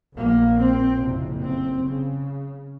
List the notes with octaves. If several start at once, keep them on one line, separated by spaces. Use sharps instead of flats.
A#1 A#2 A#3
C4
F#1 F2 C3
C4
C#3